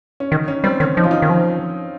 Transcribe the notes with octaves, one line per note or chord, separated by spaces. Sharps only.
C#4
D#3 D#4
C#4
G3 C4
D#3 C#4
F3 D#4
F4
D#4
D#3
F3